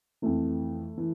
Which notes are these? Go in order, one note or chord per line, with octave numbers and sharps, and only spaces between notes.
F2 E3 A3
E3